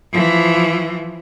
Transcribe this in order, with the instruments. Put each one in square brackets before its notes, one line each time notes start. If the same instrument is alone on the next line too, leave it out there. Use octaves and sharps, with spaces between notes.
[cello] E3 F3